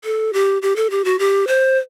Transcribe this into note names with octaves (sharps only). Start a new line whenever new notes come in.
A4
G4
G4
A4
G4
F#4
G4
C5